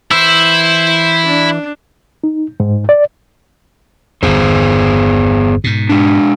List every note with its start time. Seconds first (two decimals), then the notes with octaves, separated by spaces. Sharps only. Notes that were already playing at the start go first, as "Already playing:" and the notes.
0.11 E3 E4 C5 E6
1.26 D4
2.24 D#4
2.60 G#2
2.89 D5
4.23 G1 E2 B3 G#4 C5
5.64 G#2 B2
5.90 G#3 D4